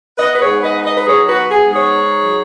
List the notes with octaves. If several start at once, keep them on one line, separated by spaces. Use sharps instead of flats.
B3 B4 D#5
B4
G#4 C#5
G#2
B4 D#5
D#4
B4 D#5
B4
F#3 G#4 C#5
F#4 B4
B3
G#4
G#2
G#4 C#5
D#4
F#3